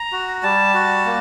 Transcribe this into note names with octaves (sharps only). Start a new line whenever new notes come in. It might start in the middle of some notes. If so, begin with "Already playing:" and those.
Already playing: A#5
F#4
G3 A5
F#4
A#3